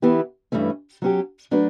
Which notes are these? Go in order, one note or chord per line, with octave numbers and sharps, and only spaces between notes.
E3 B3 E4 G4
G2 E3 A3 C#4
F#3 C#4 G4
F#3 A3 D4 F#4 B4